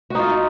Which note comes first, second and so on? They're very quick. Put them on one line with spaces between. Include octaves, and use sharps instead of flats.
F#4 D#4 F4